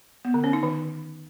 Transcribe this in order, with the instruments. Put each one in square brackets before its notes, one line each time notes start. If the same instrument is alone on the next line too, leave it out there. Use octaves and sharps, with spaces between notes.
[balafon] B3
D3
C#4
D#4
D#3